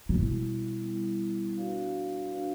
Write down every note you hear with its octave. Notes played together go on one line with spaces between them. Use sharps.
B2 G3 B3 E4
G3 B3 E4
D4 F#4 B4 D5 F5
D4 F#4 B4 D5 F5